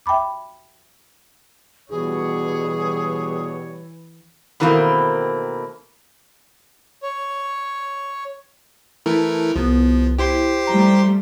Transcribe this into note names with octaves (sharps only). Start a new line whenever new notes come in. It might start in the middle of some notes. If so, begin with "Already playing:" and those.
E5 G5 A5 B5 D6
B2 E3 G3 G#4 C#5
B2 D#3 E3 A3 A#3 C4
C#5
E3 A3 E4 A#4 A5
C2 F3 B3
E4 G4 C5 C6
F3 G3 A3 A#5